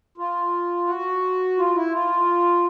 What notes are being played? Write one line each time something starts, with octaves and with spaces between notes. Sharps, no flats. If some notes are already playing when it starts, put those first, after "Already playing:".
F4
F#4
F4
E4
F4